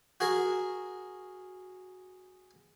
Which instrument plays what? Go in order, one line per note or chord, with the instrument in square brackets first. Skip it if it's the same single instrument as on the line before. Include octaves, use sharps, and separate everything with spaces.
[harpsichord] F#4 G#4 A#4